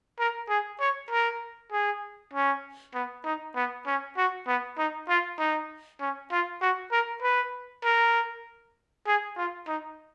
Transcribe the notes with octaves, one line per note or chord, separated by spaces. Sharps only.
A#4
G#4
C#5
A#4
G#4
C#4
B3
D#4
B3
C#4
F#4
B3
D#4
F4
D#4
C#4
F4
F#4
A#4
B4
A#4
G#4
F4
D#4